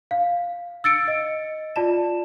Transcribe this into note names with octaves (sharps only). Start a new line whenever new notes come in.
F5
E6 A6 C#7 D7
D#5
F4 D5 A5 E7